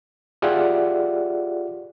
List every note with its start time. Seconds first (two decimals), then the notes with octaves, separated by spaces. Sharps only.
0.42 F4 G4 G#4 D5 E5 F#5